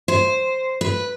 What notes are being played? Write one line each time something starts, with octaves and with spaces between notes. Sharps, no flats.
C5
B4